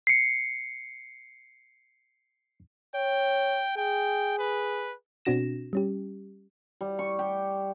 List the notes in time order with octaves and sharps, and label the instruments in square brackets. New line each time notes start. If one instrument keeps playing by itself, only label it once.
[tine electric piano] C7 C#7
[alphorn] C#5 [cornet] G5
[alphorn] G#4 [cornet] G5
[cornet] B4
[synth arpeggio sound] B2 C4 D4 F#4 A#6 E7
G3 C#4 G4
[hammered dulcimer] G3
C#6
G4